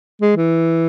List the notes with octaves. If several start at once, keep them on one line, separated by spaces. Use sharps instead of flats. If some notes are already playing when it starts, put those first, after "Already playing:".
G#3
E3